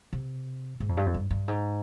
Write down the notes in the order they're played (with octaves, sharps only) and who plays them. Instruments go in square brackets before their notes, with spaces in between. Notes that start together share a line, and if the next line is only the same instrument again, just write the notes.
[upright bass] C3
G#2
F2
G2
F2
G2
G2
G#2